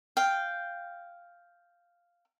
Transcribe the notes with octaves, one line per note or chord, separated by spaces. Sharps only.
F5 G5